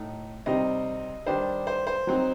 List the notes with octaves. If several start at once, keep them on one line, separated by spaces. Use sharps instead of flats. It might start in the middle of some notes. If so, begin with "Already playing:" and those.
Already playing: A2 A3 D#4
C3 G3 C4 D#4 D#5
D#3 G3 D4 C5
C5
C5
F#3 C4 D#4